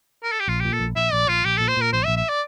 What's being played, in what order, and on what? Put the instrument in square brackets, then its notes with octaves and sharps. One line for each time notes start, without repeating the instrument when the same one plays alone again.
[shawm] A#4
A4
G4
[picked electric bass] A#1 [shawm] F4
[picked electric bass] A#2 [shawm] G4
[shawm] A4
[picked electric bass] A#1
[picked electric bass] A#1 [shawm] E5
[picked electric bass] A#1 [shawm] D5
[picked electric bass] A#1 [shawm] F4
[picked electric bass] A#1 [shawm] G4
[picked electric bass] A#2 [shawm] A4
[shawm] C5
[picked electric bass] A#2 [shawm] A#4
[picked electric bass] A#1 [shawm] C5
[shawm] E5
[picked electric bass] A#1
[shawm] E5
D5